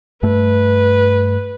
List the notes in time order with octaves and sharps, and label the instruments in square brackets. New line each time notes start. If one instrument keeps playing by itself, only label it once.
[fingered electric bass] G2 A3 [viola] B4